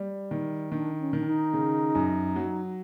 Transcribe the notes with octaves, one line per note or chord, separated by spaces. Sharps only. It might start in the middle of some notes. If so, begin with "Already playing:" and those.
Already playing: G3
D#3
D#3 D4
C#4
D#3
D4
D#4
C#3
F#2
F#3